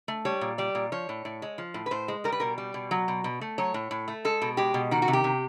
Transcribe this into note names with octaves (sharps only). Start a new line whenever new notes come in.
A3
G3 C#5
A#2
G3 D5
A#2
F3 C#5
A2
A2
G#3
F3
A2
B4
A2 C5
G#3
G3 A#4
B4
B2 A#4
G3
B2
F#3
B2
B2
A3
F#3 C#5
A2
A2
A3
G#3 A4
B2
G#3 G4
B2
D#3 F#4
F#4
C3
G4
C3